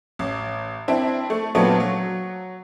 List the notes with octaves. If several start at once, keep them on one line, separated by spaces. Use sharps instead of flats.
A1
C4 D4 E4
A3
A#2 F#3 A3 B3 C4 D4
F#3